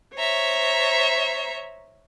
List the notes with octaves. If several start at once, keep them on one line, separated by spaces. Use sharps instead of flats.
C5 C#5 E5 A#5